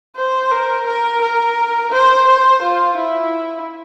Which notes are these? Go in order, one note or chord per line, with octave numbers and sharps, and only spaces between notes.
C5
A#4
A#4
A#4
C5
C5
F4
E4